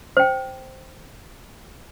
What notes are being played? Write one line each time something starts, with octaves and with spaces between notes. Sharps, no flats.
C5 G5